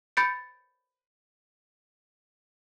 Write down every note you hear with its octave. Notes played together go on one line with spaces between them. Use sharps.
B5 G6 A6 C#7 D7